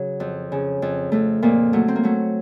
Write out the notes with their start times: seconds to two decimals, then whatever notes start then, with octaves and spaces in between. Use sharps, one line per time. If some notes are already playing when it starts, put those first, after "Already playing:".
Already playing: C#3 F#3
0.20 F2
0.52 C#3
0.82 F2
1.12 F2 A3
1.42 F2 A#2 A#3
1.73 F#3 A3
1.88 C4
1.96 A#3
2.03 F#3 A3